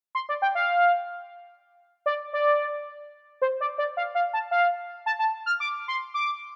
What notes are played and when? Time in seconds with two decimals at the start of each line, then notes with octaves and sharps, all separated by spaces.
0.15 C6
0.29 D5
0.42 G5
0.55 F5
2.06 D5
2.33 D5
3.42 C5
3.61 D5
3.78 D5
3.97 F5
4.15 F5
4.33 A5
4.51 F5
5.06 A5
5.19 A5
5.46 F6
5.60 D6
5.88 C6
6.14 D6